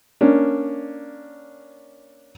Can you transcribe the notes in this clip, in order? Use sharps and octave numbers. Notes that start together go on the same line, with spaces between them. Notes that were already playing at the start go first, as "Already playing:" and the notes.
A#3 C#4 D4